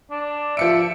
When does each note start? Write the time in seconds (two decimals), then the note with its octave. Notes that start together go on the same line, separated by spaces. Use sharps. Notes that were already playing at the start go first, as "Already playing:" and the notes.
0.11 D4
0.57 F3 E5 C#7 D7